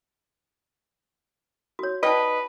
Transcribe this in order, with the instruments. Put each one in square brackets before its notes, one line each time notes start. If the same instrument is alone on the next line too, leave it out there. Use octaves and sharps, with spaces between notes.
[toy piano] F#4 C#5
[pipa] D#4 D#5 [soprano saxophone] B4 [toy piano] D5 G5 A5